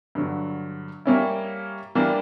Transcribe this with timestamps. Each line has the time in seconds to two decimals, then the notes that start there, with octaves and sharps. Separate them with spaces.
0.15 G2 D3 F#3
1.06 G3 A#3 C#4 E4
1.95 E3 G3 A#3 D4